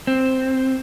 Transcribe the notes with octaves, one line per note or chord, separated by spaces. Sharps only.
C4